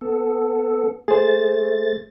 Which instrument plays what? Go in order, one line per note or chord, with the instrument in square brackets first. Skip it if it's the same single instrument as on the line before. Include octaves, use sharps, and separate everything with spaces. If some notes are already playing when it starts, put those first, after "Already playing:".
[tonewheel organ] B3 A4
[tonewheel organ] A3 A6 [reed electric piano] G#4 C5